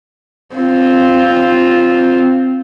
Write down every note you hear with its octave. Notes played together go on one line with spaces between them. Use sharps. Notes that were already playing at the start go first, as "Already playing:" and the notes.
C4 F4